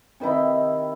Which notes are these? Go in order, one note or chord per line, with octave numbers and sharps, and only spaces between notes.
C3 D#3 D#4 E4